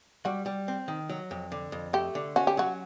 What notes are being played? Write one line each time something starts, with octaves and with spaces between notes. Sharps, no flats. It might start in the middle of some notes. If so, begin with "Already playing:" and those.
G3 F#4
G3
C4
D#3
F#3
F2
D3
F2
A3 G4
D3
C#4 F#4
G4
F#3 F#4